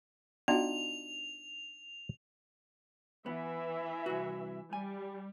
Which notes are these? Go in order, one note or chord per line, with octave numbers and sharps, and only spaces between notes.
B3 D4 D#4 F4 F#4 F7
E3 B3 E5
C2 F#4
G3 G#5